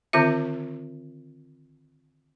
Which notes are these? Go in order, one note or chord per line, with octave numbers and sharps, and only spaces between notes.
D3 D#3 C4 F4 E5